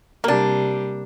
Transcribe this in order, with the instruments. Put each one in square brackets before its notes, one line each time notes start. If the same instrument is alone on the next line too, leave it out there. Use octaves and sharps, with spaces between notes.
[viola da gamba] C3 G3 [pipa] A#3 D4